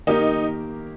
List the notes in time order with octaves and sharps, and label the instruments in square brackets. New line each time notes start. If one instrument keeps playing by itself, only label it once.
[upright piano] D#3 A#3 G4 A#4 [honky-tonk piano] D#4